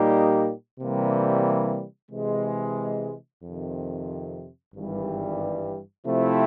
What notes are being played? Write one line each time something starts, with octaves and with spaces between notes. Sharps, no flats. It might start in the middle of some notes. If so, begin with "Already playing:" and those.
Already playing: A#2 G3 A#3 D#4 G4
C3 E3 G3 A#3
C3 E3 G#3
F2 C3 D#3
G#1 G2 E3 G3
C3 F3 A3 C4 E4